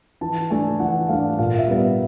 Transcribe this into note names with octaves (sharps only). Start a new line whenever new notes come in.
E3 A5
A3 D4 G#5
E3 F#5
A3 D4 F5
A#2 F5
E5
G3 B3
E5